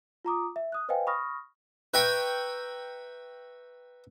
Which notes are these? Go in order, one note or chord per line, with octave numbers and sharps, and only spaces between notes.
F4 A#5 D6 D#6
E5
D#6 F#6
B4 C5 D#5 F5 G5 G#5
B5 C#6 D#6 F6 A#6
B4 E5 G5 A#5 B5 C#6